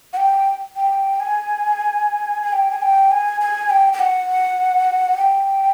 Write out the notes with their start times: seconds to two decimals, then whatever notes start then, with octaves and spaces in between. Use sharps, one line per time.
0.13 F#5
0.17 G5
0.76 G5
1.20 G#5
2.43 G#5
2.53 G5
2.71 G#5
2.82 G5
3.11 G#5
3.41 G#5
3.70 G5
3.93 G5
3.99 F#5
5.17 G5